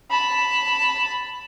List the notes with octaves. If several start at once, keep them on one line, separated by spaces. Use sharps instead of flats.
A5 B5